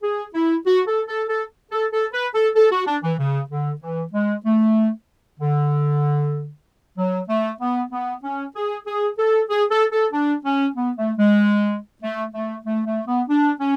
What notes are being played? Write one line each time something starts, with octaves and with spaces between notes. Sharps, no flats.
G#4
E4
F#4
A4
A4
A4
A4
A4
B4
A4
A4
F#4
D4
E3
C#3
D3
E3
G#3
A3
D3
F#3
A3
B3
B3
C#4
G#4
G#4
A4
G#4
A4
A4
D4
C#4
B3
A3
G#3
A3
A3
A3
A3
B3
D4
C#4